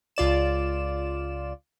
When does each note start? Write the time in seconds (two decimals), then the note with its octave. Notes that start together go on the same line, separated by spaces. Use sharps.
0.16 C#2 F4 D5 E7